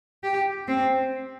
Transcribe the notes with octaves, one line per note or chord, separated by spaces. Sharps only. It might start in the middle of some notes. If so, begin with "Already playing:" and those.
G4
C4